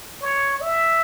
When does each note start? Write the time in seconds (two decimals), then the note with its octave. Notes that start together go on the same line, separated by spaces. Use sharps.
0.22 C#5
0.61 E5